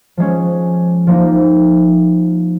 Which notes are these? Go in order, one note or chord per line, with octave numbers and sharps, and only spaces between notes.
F3 G#3 C#4
F3 A#3 D#4